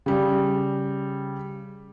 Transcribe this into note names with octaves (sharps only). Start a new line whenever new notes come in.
C#3 G3